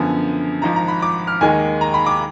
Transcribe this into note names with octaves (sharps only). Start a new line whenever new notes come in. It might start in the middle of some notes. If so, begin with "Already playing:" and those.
Already playing: F#2 D3 F3 B3 G#5
G#1 G#2 F3 A#5
A#5
B5
D6
F6
D#2 D#3 G#3 G#5
A#5
B5
D6